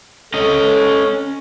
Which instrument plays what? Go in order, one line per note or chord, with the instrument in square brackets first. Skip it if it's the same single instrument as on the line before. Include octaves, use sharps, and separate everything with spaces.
[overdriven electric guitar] C#4 D#5 [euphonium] A4